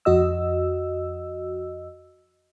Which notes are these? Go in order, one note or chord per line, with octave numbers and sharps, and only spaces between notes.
F2 F#4 D#5 E6